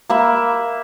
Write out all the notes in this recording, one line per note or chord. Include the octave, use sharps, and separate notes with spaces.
A#3 E5 B5